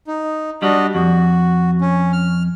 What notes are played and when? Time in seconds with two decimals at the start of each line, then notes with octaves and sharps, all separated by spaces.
0.07 D#4
0.62 G3 D4 F#4 D#5
0.95 F2 F#4
1.81 C#4
2.13 F6